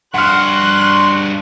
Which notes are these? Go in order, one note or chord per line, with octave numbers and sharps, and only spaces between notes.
G2 F#4 F#5 C6 C#6 F6 F#6